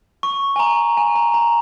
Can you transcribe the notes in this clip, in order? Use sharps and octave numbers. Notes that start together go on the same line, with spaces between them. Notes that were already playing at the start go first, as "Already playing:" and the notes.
C#6
G#5
A#5
G#5
A#5
A#5